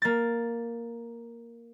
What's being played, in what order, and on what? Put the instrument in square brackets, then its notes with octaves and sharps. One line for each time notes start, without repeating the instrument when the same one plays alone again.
[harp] A#3 A6